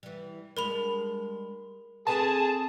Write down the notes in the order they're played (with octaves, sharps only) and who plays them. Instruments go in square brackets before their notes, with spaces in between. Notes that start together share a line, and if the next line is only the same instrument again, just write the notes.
[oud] E3 G3
[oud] G3 G#3 D4 [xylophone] A#4 B5 F7
[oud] C4 A4 B4 [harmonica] G#4 [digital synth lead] A5